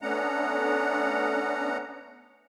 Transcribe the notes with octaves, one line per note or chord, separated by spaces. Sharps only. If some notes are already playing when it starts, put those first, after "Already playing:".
A3 B3 C#4 D4 F#5 A#5